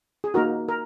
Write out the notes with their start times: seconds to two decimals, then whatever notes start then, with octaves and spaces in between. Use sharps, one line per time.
0.24 G#4
0.34 A#3 D#4 F#4 A#4
0.69 A#4